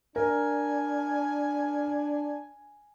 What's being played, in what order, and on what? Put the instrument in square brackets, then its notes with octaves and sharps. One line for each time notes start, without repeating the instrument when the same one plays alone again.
[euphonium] D4 [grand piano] A#4 [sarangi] G#5